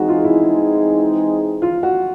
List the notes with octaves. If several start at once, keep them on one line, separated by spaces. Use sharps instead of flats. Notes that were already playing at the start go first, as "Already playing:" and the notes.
Already playing: E3 G#3 C4 D#4 F#4 G#4
F4
E4
F4
F#4